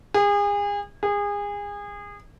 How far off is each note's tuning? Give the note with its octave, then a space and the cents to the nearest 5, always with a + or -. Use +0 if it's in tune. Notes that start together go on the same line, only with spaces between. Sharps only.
G#4 -35
G#4 -30